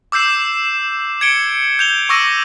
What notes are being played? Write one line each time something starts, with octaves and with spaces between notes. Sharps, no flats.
D6 E6 G6 C7 E7
G#6 C#7 D7 G7
G6 F7 G7
C#6 D6 E6 A#6 D#7